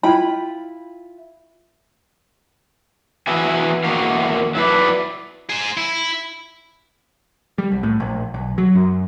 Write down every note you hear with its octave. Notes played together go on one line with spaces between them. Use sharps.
E4 F4 G5 B5
E3 B3 F#4 E5 G#5
E2 D#3 A#3 F#4 F5
F#3 E4 B4 D5
G#4 C5
E4
G3
C2
A2
A#1
B1
F#3
F#2